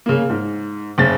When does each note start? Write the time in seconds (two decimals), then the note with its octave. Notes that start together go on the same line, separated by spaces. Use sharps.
0.06 C#3 A#3
0.30 G#2
0.98 F#1 C#3 A6